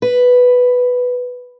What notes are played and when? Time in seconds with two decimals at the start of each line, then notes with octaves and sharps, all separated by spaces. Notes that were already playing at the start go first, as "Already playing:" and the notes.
0.02 B4